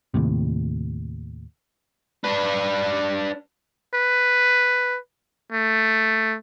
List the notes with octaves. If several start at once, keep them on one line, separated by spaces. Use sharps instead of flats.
D#2 A2 C3
D4 B4
B4
A3